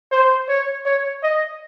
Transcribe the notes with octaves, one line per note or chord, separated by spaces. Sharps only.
C5
C#5
C#5
D#5